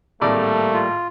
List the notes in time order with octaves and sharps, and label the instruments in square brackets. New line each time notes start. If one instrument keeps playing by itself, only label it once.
[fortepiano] G#1 A2 D5 [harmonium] G3 A#3 [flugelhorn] A3
[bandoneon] F4